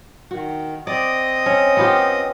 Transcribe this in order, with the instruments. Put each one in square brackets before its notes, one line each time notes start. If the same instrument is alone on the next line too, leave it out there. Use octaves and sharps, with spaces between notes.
[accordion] D#3 [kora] F#4
[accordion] C4 D#5 D#6 [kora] D5
[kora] C#4
B3 F4 G4